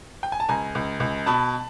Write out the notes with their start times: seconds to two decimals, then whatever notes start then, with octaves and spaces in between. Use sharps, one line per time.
0.23 G5
0.32 G#5
0.40 A5
0.48 C#2 G#5 A#5
0.75 C#2
1.00 C#2
1.26 B2 A5 B5